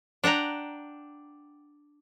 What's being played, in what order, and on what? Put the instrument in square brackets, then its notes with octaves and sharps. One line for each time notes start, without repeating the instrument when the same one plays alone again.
[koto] D4 F#5 G5 A#5